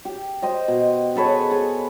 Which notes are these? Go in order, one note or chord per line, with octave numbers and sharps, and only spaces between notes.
G4
C5 D#5 G5
B2
G#4 A4 B4 C#5
G#4